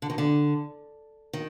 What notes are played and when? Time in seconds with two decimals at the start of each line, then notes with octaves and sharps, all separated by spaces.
0.02 D3
0.10 D#3
0.18 D3
1.33 D#3